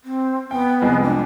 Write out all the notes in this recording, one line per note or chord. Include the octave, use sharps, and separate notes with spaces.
C4
B3 G5
C2 F2 G#3
D4